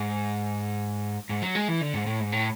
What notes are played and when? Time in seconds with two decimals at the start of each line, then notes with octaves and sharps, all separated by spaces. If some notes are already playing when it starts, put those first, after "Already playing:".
Already playing: G#2
1.29 G#2
1.42 F#3
1.55 G#3
1.68 E3
1.81 D3
1.94 G#2
2.06 A2
2.20 G#2
2.32 A2